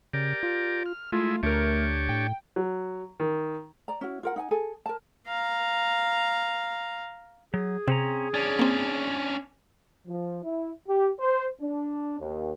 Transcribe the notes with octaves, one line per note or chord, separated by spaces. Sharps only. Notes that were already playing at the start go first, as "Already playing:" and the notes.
C#3 G4 A#4 D5
F4
F6
G#3 A3 E4 F4
D2 A3 D4 G4 A#4 C#5
A2 G5
F#3
D#3
D5 A#5
C#4 E4 F#4
F4 A#4 F#5
D#4 F#5 G#5
G#4 A4 G#5
A#4 A5
F5 A#5
F#3 G#4
C3 C4 C#4 A#5
C#4 D4 D5
A#3 C4
F3
E4
G4
C5
D4
D#2